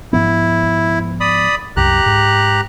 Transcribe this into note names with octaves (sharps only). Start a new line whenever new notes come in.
G#2 F3 B3 E4
D5 B5 D#6
C2 F#2 G4 A#5 F#6
G#2